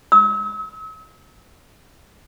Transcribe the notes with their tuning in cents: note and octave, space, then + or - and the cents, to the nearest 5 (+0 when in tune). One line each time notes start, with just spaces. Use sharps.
E6 -45